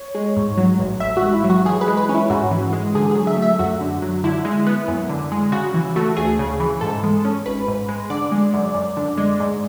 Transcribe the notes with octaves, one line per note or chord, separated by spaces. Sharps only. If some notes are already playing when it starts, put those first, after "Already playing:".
Already playing: C#5
G#3
G#2
F#3
A1
A1 E5
F#4
G#2
E4
F#3
F#4
E3 G#4
B4
G#3
B4
C#4
E4
G#2 F#4
E3
G#3
D3 G#4
F#3 G#4
E5
A3
E5
F#2 F#4
D3
F#3
D3 E4
G#3
B3
F#2
D3
G#3
C#3 F#4
E3
A3 F#4
D2 G#4
C#3
E3
G#2 A4
G#3
C#4
G#1 B4
G#2
G#3
D3 D5
G#3
F#2
F#2
D3
G#3
G#2